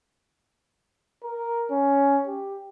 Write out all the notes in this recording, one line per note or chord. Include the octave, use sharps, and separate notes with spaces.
A#4
C#4
G4